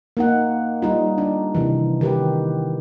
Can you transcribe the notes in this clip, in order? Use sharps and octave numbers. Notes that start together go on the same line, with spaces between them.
A#3 D#4 F#5
G3 D#4 F4
D4
C3 D#3 E3
D#3 G4 B4